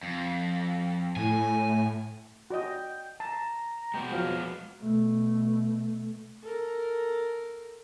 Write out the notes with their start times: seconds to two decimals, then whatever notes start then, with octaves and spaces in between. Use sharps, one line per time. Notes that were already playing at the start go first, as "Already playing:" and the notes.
0.03 F2
1.16 A2 G#5
2.50 F#4 D5 D#5 G5
3.20 A5 A#5
3.94 G#3 B3 F#4 G5
4.12 F3 F#3 F5
4.82 B2 A3
6.43 A4 A#4